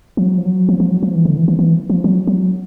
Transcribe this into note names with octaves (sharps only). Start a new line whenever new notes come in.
F3
F#3
F3
F#3
F3
F3
F#3
F3
E3
D3
E3
E3
E3
F3
F#3
F#3